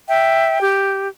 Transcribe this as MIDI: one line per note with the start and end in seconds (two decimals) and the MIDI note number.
0.08 0.61 76
0.08 0.61 79
0.61 1.08 67